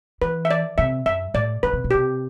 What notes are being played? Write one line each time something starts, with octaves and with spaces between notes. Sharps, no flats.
E3 B4
E5
D5
C3 E5
F#2 E5
A2 D5
D3 B4
C3
B2
C3 G4